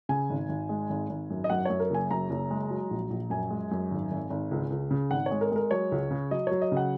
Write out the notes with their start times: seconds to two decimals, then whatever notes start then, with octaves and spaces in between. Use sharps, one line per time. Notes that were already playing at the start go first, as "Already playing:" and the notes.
0.09 C#3 G#5
0.30 G#1
0.49 G#1
0.69 G#3
0.90 G#1
1.10 G#1
1.30 F#2
1.44 D#5
1.50 F#2 F#5
1.65 F#2 C#5
1.80 A#4
1.90 F#1 G#5
2.11 F#2 A#5
2.30 F#1
2.50 G#3
2.71 F#3
2.91 A#1
3.10 A#1
3.30 F#2 G#5
3.50 G#3
3.71 F#2
3.91 G#1
4.11 G#1
4.30 G#1
4.51 C#2
4.70 C#2
4.91 C#3
5.10 G#1 F#5
5.26 G#3 C#5
5.41 A#4
5.51 G#3 A#4
5.71 F#3 C#5
5.92 C#2
6.11 C#3
6.31 F#3 D#5
6.47 F#3 C#5
6.62 D#5
6.72 C#3
6.77 F#5